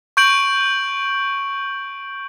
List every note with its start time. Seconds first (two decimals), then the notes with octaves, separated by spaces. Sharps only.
0.17 C#6 G6 D7 F#7